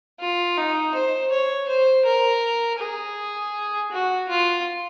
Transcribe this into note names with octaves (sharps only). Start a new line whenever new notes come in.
F4
D#4
C5
C#5
C5
A#4
G#4
F#4
F4